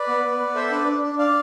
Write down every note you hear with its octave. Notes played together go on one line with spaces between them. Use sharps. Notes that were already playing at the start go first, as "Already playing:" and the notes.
Already playing: B4 D5
B3
B3
B3
A4 C5 E5
D4 B4 D5
D4
D4
D4 D5 F5